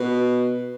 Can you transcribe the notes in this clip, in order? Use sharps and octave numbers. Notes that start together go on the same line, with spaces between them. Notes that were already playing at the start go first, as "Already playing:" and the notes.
Already playing: B2